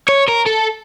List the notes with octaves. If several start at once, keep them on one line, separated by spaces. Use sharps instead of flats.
C#5
A#4
A4